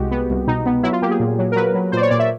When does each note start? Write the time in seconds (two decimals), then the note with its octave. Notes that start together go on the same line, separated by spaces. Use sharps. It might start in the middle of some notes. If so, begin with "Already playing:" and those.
Already playing: C2 G#3 F#4 G4
0.11 B3
0.30 C2
0.47 B2 D#4
0.66 B3
0.83 F#3 E4
0.93 F4
1.02 A#3 G4
1.11 G#4
1.20 A#2
1.39 F#3
1.52 A#4
1.56 F#3 B4
1.75 F#3
1.92 A#2 C5 D5
2.02 C#5
2.11 A#2 D5
2.19 E5